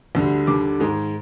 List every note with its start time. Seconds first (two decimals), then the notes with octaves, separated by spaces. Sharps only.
0.15 D2 D3 G3
0.47 D#2 D3 G3 D6
0.80 G#2 D#3 G#3